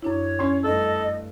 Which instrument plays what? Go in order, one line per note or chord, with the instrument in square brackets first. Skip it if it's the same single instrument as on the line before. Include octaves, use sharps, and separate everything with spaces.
[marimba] F#2 D4 E4 [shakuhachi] C#5
[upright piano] C#4 C6 C#6
[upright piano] G2 A3 [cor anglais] A4 [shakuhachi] D#5